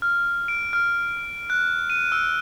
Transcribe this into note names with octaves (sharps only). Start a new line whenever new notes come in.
F6
D7
F6
F#6
D#7
E6